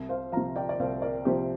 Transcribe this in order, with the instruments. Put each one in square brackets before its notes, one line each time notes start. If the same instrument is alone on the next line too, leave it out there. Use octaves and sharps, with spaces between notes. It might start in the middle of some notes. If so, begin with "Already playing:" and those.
Already playing: [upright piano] C2
C5 F5
F3 F5 A#5
C3
D5 G5
D5
C2 C5 F5
A#4 D5
C3 F3 G4 C5